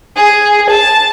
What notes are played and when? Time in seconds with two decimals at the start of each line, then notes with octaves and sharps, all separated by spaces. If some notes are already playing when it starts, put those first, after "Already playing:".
0.16 G#4
0.70 A5